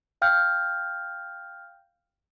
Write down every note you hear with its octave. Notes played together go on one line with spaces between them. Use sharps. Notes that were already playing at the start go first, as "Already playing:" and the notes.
F5 G5 F6 G6